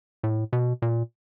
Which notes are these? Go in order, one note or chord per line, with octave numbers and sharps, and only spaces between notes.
A2
B2
A#2